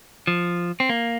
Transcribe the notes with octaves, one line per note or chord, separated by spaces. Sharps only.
F3
C4
A#3